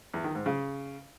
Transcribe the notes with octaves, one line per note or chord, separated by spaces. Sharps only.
E2
D#3
G#2
C#3